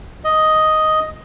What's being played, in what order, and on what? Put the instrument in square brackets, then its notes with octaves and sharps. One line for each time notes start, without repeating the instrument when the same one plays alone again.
[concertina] D#5